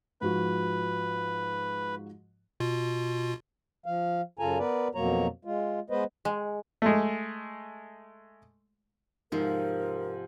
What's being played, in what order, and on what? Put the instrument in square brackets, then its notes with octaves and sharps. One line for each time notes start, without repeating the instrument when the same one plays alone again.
[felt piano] G#2 F3 F#4 [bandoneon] B4
[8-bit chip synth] B2 F4
[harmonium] F3 F5
F#2 C#3 F4 A4 G#5 A#5
B3 A#4 B4 D5
F2 B2 F#3 A#3 C#5 A#5
G#3 F4
G#3 B3 B4 C5 D#5
[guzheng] G#3
[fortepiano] G#3 A3
[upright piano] G#2 [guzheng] C3 F3 C4 [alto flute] A#4